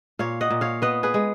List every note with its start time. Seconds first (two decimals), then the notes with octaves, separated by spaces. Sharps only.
0.19 A#2 C#5 F5
0.41 D#5 F#5
0.50 A#2
0.61 C#5 F5
0.82 B3 B4 D#5
1.03 G#4 B4
1.14 G#3